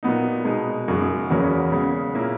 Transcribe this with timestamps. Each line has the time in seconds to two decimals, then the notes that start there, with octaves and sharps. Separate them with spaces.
0.03 A#2 F#3 B3 D#4
0.44 B2 G#3 D#4
0.88 F#2 C#3 G#3
1.30 E2 C#3 F#3 A#3 C#4
1.72 C#3 G#3 B3
2.15 A#2 A#3 C#4 E4